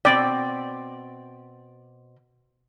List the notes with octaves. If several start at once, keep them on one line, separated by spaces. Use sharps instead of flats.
B2 C4 D5 G5